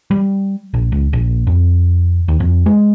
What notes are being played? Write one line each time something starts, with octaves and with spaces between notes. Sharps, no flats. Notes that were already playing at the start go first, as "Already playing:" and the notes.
G3
A#1
C#2
A#1
F2
D#2
F2
G#3